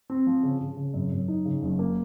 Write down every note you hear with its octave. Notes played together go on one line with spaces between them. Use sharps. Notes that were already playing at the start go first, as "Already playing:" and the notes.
C4
F3
C#3
C#3
C#3
F#2
F#2
D#4
C#3
F#1
A#3